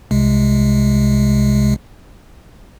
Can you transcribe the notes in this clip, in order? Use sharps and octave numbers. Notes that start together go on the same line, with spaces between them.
C2 C3 G#3